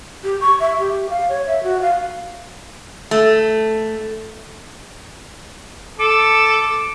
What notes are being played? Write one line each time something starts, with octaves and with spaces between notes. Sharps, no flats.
G4
C#6
E5
G4
F5
C#5
E5
F#4
F5
A3
A4 D6